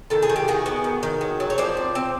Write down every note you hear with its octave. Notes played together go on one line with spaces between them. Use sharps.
D#3 A4
G#4
D#3
G4
D#3 F#4 G#4
B3
D#3
D#3
F#3
F#3
C#5
F3 C5 D5
C4
C4